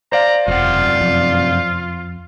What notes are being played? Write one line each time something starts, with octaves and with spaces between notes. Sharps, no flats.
C5 D5 F5 A#5
E1 F#2 C3 F4 F#5
F2